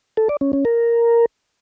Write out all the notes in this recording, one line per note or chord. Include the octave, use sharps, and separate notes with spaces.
A4
D5
C#4
C#4
A#4